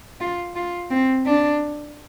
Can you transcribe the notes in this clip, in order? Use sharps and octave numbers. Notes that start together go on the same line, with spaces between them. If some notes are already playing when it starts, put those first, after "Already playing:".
F4
F4
C4
D4